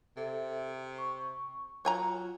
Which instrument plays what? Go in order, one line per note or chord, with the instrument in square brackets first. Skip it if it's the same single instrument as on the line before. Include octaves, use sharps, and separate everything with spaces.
[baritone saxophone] C3 [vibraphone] A4 E5
[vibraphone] C#6
[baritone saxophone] F#3 [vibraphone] F4 [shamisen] C#5 G#5 A#5